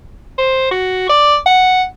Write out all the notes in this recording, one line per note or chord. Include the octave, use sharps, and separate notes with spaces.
C5
F#4
D5
F#5